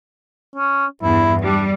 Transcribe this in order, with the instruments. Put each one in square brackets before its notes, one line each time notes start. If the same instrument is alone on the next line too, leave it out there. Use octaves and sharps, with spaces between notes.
[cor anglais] C#4
[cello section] E2 G2 [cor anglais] E4
[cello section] G3 [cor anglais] D4